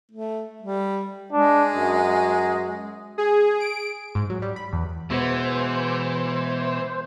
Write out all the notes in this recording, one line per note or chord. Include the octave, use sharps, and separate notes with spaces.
A3
G3
G#3 D4
F#2
G#4
D7
G#2
F#3
G3
B5
E2
B2 E3 G#3 B3 C5